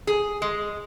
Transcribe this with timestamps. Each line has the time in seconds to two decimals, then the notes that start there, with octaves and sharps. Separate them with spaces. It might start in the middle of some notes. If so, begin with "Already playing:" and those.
0.07 G#4
0.42 G#3